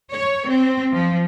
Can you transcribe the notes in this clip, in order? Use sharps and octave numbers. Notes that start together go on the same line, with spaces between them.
C#5
C4
F3